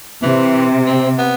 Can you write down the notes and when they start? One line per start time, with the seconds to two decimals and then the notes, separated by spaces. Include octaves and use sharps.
0.22 C3 E3
0.86 C4
1.19 B3